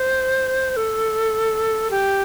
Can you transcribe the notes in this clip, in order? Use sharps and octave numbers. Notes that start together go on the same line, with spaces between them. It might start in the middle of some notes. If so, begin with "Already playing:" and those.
Already playing: C5
A4
G4